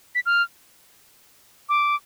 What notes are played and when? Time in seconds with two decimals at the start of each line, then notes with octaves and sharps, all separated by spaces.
0.15 B6
0.26 F6
1.69 D6